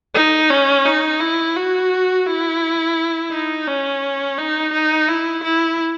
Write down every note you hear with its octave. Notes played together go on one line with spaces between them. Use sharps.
D#4
C#4
D#4
E4
F#4
E4
D#4
C#4
D#4
D#4
E4
E4